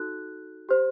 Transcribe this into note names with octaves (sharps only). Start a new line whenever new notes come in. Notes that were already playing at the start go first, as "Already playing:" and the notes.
Already playing: D#4 F#4 A4 F#6
G4 C5